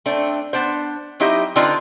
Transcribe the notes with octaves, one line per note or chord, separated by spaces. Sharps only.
A3 C4 D4
B3 D4 C5
F#3 C4 D#4 E4 G4 D#5
D3 C4 D4 D#4 F4 B4